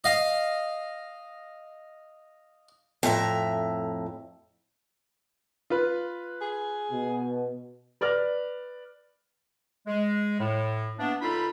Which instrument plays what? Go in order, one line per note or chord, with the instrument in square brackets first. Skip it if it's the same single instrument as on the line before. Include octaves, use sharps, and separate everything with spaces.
[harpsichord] D#5 F5
[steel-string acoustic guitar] F2 A2 E5 A#5
[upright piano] F4 B4
[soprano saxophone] G#4
[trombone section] B2
[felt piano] B4 D5 F6 A#6
[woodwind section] G#3
A2
E3 A#3 B3 D4
C#2 D#4 F4 A4 B5